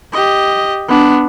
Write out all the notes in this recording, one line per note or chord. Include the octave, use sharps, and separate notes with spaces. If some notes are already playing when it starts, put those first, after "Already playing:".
G4 D#5
B3 D4